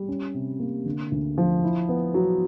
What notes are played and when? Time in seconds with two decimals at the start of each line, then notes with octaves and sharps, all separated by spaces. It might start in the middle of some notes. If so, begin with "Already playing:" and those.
Already playing: G3
0.08 C#4
0.34 C3
0.60 A#3
0.86 D3
1.12 D2
1.38 F3
1.64 E4
1.89 B3
2.14 F#3